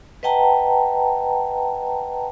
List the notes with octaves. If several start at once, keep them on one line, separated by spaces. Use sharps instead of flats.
B4 D#5 F#5 G5 A5 A#5